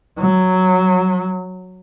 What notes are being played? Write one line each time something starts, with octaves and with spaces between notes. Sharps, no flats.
F#3